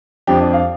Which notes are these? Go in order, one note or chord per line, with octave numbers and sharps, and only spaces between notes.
F2 F3 D4 G4
D5
F5